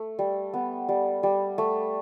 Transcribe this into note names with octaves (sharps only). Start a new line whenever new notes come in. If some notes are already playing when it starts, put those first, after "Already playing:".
Already playing: A3
G3
B3
G3
G3
A3